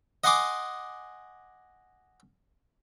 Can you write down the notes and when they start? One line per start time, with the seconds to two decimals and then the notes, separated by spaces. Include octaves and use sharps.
0.24 D#5 F#5 G#5 C6 D6 D#6